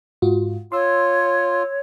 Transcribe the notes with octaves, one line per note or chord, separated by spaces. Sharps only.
G#2 F4 F#4
F4 C#5 C6 E6